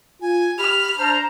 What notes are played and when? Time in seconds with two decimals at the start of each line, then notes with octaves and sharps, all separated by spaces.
0.22 F4 G#5
0.58 G4 B5 F6
0.99 D4 C5 A5 A#5